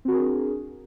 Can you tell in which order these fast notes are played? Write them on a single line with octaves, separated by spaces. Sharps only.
C4 F#4 A#4 G#4 D4